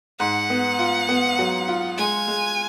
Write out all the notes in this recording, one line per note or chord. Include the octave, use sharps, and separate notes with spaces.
G#2 F#5
B3
F4
B3
F#3
F4
G#3 G#5
G#3